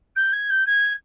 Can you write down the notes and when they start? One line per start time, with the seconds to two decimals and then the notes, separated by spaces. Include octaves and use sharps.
0.16 G6
0.32 G#6
0.50 G6
0.66 G#6